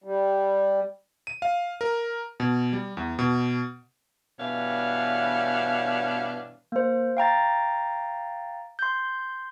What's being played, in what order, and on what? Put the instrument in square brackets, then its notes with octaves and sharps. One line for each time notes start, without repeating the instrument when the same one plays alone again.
[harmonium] G3
[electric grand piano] D#7
F5
A#4
B2
G3
E2
B2
[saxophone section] G2 B2 E3 D4 C#5 F5
[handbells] A#3 C5
F5 G5 A#5 A6
C6 G6